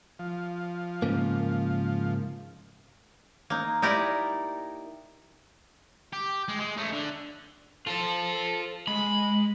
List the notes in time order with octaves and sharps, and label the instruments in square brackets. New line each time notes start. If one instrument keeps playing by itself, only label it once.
[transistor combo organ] F3
[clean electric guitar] G#2 C#3 A#3
[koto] A#3 D#4
D#4 E4 G4 A#4 D5
[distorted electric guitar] G4
G#3
G#3
A3 C#4
D3
[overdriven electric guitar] F4 C5 [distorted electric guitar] A4 A5
[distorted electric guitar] G#3 [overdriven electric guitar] B5